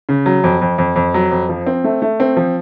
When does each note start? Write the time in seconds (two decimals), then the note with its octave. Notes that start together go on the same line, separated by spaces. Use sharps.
0.09 C#3
0.26 F#3
0.44 F2
0.62 F2
0.78 F2
0.96 F2
1.14 F#3
1.31 F2
1.49 F3
1.66 C4
1.84 A3
2.02 A3
2.20 C4
2.37 F3